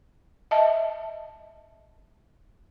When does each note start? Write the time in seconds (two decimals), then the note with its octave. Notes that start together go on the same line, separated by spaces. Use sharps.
0.51 D#5 E5 A5